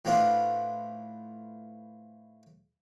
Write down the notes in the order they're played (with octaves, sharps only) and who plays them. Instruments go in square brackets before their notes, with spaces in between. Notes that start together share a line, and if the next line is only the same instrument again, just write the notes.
[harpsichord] A2 F3 B3 D4 F4